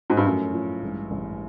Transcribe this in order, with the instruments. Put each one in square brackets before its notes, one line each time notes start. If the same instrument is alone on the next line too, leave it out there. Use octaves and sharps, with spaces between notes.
[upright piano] G#2
G2
[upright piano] F#2 [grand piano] A2 F3 A3 C#4
[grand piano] A2 F3 A3 C#4
A1 G2 E3 G#3
A1 G2 E3 G#3